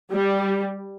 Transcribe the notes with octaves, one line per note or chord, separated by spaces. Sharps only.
G3